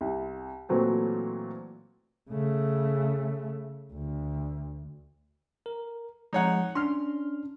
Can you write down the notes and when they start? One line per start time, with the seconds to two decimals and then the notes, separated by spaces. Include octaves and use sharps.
0.01 C2
0.69 A#2 E3 F#3 A3 C4
2.30 C#3 A3
3.93 D2
5.66 A#4
6.33 F3 G#3 D#4 C#5 F#5
6.75 C#4 D4 C6 F6